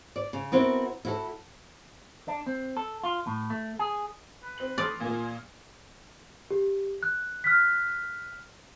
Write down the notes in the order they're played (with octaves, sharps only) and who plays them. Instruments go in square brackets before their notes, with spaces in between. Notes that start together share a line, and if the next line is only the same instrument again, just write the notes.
[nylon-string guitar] D5
C#3
B3 C4 E4 F#4 G4 A#4
E4 F#4 A4
[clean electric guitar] D4
C4
A4
F4
A2
A3
G#4
[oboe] B4
[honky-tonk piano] C4 F#7
[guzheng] D5 [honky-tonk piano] C6 D#6 F6
[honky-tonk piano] A#2 A#3 [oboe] G#5
[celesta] G4
F#6
F6 F#6 B6